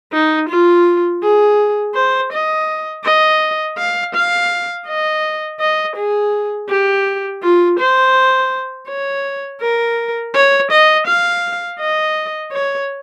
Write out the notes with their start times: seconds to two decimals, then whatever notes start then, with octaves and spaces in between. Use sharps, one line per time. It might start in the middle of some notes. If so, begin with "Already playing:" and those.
0.13 D#4
0.49 F4
1.22 G#4
1.95 C5
2.32 D#5
3.04 D#5
3.78 F5
4.15 F5
4.87 D#5
5.60 D#5
5.96 G#4
6.69 G4
7.42 F4
7.79 C5
8.88 C#5
9.61 A#4
10.35 C#5
10.71 D#5
11.07 F5
11.80 D#5
12.53 C#5